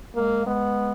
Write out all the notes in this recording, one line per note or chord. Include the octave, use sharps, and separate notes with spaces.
G#3 A#3
G#3 B3